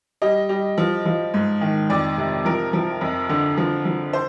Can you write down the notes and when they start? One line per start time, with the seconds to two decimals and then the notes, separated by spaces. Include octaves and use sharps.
0.22 G3 D#5
0.49 G3
0.78 F3
1.05 F3
1.34 G#2
1.61 D#3
1.90 F2 D5
2.18 C3
2.45 F3 A#4
2.73 F3
3.01 F2
3.29 D3
3.57 F3
3.85 F3
4.13 C5